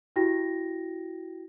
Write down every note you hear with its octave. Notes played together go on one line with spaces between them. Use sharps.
E4 F#4 G4 G5 A#6